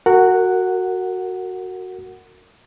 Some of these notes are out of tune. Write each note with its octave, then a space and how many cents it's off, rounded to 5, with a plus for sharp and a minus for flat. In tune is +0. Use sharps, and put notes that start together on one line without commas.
F#4 +0 A#4 -30 F#5 +0